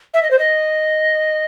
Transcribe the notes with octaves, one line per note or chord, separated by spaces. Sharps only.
E5
D#5
C5
D#5